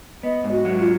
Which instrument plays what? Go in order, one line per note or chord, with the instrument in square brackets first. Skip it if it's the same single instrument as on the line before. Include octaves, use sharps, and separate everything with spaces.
[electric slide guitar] B3 [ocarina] D#5
[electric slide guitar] G#2
[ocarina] F#4
[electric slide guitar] F#3
[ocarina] F4